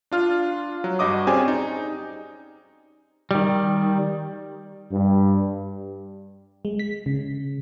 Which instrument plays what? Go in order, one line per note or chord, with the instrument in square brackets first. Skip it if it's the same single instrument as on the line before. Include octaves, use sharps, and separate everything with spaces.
[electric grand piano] D4 F4 F6
F#3
G2 F#4 D#5 D6 D#6
C4 C#4 G4 G#4 D5 G#5
D#4
[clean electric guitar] D#3 G3
[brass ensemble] G2
[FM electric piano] G#3
B6
C#3